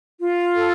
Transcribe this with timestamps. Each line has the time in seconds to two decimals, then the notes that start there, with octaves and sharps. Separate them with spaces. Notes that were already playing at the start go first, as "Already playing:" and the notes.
0.20 F4
0.56 A4